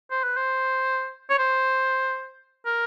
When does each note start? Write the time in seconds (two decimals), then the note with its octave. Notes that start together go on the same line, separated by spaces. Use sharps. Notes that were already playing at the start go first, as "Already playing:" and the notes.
0.11 C5
0.24 B4
0.37 C5
1.30 C#5
1.39 C5
2.66 A#4